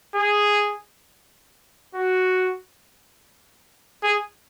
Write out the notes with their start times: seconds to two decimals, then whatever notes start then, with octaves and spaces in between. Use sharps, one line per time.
0.15 G#4
1.95 F#4
4.03 G#4